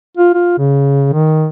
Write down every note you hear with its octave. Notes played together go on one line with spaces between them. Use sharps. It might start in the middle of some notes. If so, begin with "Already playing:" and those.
F4
F4
C#3
D#3